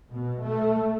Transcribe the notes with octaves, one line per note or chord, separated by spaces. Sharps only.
B2
A3